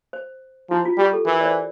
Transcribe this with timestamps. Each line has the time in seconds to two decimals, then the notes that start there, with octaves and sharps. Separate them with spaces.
0.13 C5
0.70 F3 E4
0.85 F4
0.98 G3 G4
1.13 A4
1.26 E3 A#4
1.41 D5
1.45 C5